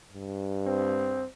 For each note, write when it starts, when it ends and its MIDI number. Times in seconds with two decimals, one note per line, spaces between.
0.13 1.30 43
0.66 1.25 60